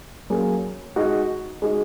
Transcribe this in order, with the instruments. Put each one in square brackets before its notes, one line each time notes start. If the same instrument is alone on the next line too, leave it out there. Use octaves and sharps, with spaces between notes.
[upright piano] F#3 A#3 C#4 G#4
G#3 D#4 F#4
G#3 D#4 F#4